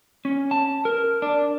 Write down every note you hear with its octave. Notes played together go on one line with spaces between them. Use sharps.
C#4
A5
A#4
D4